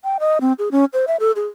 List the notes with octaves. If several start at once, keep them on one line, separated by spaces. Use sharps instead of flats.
G5
D#5
C4
G#4
C#4
C5
E5
A4
G#4